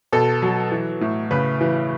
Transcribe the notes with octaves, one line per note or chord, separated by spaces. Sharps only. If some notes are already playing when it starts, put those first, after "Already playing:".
B2 A4
F#3
E3
A2
C#3 B4
E3